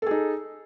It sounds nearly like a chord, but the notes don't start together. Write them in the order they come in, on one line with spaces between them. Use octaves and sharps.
A4 G#4 D#4